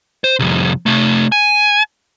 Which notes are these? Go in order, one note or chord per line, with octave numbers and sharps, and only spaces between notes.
C5
C2 F2
C3 A3
G#5